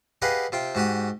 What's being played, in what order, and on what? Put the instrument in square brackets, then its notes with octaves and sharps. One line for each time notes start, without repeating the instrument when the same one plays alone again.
[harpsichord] G4 G#4 B4 D#5 F5 F#5
C3 F4 G5
G#2 F#4 G4 D#6